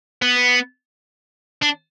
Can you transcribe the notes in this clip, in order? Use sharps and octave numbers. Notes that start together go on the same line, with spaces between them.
B3
D4